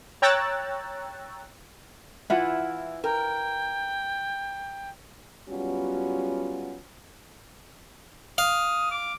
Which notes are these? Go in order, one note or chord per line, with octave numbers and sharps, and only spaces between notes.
C#5 G5 A#5 E6 F#6 A6
E3 E4 F4 F#5
A#4 G5
F#3 G3 B3 C#4 F4 F#4
F5 D#6
D6